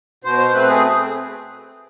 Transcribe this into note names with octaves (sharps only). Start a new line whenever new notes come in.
B2 C5
C5
A3 C4 B4
G#4